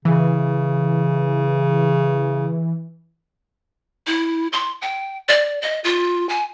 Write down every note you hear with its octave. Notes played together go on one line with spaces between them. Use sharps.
C#3 E3
E4
C6
G5
D5
D#5
F4
G#5